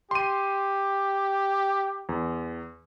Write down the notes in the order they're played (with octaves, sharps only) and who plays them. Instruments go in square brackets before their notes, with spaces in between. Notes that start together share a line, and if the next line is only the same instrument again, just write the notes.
[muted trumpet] G4 [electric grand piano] C6 D#7
[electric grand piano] E2